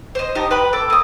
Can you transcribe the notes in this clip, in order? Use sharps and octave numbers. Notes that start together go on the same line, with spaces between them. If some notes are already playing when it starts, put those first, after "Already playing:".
C5 D#5
D#4 G4 D#5 A5
B4 G5 B5
A4 G5 D6
A#3 D#6